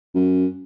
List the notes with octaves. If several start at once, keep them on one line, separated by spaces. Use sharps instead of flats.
F#2